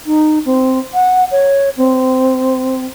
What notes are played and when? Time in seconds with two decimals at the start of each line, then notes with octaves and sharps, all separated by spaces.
0.06 D#4
0.45 C4
0.94 F#5
1.32 C#5
1.77 C4